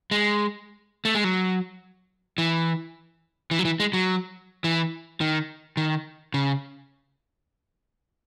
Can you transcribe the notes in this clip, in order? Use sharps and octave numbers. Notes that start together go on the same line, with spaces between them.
G#3
A3
G#3
F#3
E3
E3
F#3
E3
G#3
F#3
E3
D#3
D#3
C#3